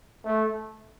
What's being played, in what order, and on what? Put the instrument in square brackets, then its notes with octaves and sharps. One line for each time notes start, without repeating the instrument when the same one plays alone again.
[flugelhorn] A3